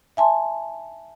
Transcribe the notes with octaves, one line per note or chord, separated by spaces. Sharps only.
E5 G#5 A5 C6